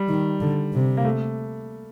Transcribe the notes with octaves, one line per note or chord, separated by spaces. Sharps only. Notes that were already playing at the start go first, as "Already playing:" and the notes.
Already playing: G3
D#3
D3
C3
A#3
A3